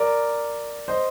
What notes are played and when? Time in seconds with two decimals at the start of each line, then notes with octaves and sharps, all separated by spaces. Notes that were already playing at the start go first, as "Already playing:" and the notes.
Already playing: A#4 D5
0.88 C5 D#5